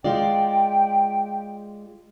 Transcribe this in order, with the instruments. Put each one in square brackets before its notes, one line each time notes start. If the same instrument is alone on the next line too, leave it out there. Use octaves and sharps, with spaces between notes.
[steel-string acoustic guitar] G#3 F4 D5 [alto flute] G5